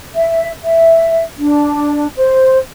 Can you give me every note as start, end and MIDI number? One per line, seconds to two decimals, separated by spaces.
0.15 0.50 76
0.63 1.21 76
1.39 2.07 62
2.16 2.57 72